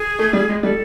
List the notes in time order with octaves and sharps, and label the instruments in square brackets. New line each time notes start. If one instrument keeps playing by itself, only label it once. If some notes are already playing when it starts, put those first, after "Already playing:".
Already playing: [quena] G#4
[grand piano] A3
G3
G#3
[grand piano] G3 [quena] A4